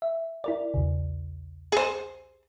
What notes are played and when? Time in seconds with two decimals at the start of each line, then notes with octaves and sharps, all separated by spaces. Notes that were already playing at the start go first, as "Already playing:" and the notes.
0.02 E5
0.44 E4 A#4 D5
0.74 B1 E2 C#3
1.72 G#4 C5